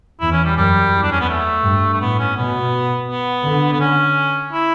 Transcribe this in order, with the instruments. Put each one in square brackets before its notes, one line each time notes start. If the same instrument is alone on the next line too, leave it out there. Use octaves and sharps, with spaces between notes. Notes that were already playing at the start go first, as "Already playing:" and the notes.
[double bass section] E2 [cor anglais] E4
[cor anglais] C#4
G3
[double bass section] F#2 [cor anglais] G3
[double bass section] E2
[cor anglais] D4
C#4
B3
A3
[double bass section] G2
[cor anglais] A3
[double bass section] A2 [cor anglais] B3
[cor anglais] C#4
[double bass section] B2 [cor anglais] B3
[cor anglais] B3
[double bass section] D3
[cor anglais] B3
C#4
E4